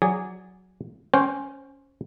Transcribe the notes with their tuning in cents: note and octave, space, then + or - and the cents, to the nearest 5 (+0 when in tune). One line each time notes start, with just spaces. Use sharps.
F#3 +0 G#4 -10 D5 -20
C#4 +0 C5 +20 G5 -20